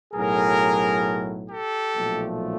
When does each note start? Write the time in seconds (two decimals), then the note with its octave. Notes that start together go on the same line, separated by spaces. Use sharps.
0.13 B1 A2 F#3 G#4 A#4
1.49 G4 A4
1.95 B1 A#2 F3 A3